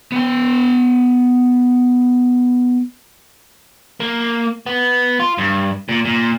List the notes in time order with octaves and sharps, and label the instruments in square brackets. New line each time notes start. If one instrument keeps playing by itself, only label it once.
[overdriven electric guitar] B3 G5
A#3
B3
F4
G2
A#2
A#2